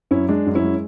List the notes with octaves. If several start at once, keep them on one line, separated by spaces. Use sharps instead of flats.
F#2 C#4 E4
G#3 D4
F#2
C#4 E4
G#3